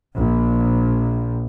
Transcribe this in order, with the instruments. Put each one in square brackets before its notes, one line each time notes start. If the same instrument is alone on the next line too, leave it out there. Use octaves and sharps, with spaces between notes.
[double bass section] A#1